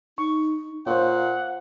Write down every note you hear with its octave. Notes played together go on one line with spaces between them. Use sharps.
D#4 C#6
A#2 C5 C#5 F5 F#5